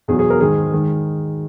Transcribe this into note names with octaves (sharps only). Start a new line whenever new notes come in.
E2 B2 F#3 G#4
G#4
A#4
G#2 D#3 G#3 G#4
D#3 G#3